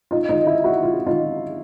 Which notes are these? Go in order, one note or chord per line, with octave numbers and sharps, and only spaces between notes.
D#4 F4
D#4 F4
E4
E4 F#4
F4
F#4
D#4 F4